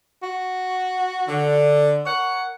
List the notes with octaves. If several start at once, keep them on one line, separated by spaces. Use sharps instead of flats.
F#4
D3
A#4 C#5 F#5